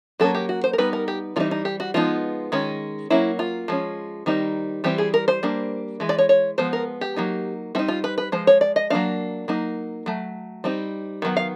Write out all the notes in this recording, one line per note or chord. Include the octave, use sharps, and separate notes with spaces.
F#3 A#3 C#4 A4
G4
F#4
C5
A#4
G3 B3 D#4 B4
A#4
G4
E3 G3 C4 D#4 F4
D#4
G4
F#4
F3 G#3 B3 D#4 F4
D#3 G#3 C#4
F#3 A#3 C#4 E4
F4
F3 G#3 C#4
D#3 G3 C4 D#4
E3 G3 C4 G4
G#4
A#4
C5
G3 A#3 D4
E3 G#3
D5
C#5
C#5
F3 G#3 B3 C5
A#4
G4
F#3 A#3 D#4
G3 C4 D#4 E4
F4
B4
B4
F3 G#3 C5
C#5
D5
D#5
F#3 A#3 D4 F5
F#3 A#3 D#4
F#3 A3
G3 C4 D#4
D#3 F#3 B3
F5